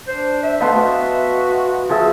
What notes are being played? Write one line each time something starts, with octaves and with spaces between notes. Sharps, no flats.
D4 C5
E5
A3 B3 D#5 F5 A5 C6
F#4
F3 G#4 E5